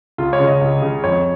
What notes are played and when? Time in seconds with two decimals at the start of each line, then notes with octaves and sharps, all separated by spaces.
0.18 C#2 F4
0.33 C#5
0.40 C#3
0.47 D#5
0.61 C#2
0.82 C#3
1.04 F2 C#5